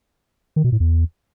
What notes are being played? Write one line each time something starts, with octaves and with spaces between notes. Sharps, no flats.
D#3
B2
A2
E2